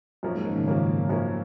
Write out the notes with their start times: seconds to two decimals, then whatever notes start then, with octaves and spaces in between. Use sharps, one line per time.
0.23 F#2 A#2 F3 A#3 C#4
0.35 G#2
0.45 D#3
0.56 C#3
0.67 F#2 F3 A#3 C#4
1.09 F#2 F3 A#3 C#4